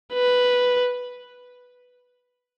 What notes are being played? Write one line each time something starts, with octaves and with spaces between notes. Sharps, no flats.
B4